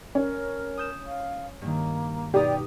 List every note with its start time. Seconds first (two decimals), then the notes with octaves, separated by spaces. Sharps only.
0.15 C#4 A#4
0.77 D#6 G6 E7
1.06 F5
1.62 G2 D#3 A#3
2.34 B2 D#4 G4 D5 D#6